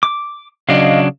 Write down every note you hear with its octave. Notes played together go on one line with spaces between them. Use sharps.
D6
C#3 F#3 D4 D#5 F5